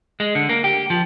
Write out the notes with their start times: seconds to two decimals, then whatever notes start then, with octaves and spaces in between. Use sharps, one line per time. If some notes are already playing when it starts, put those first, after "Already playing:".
0.20 G#3
0.35 D3
0.49 A#3
0.64 G4
0.90 F3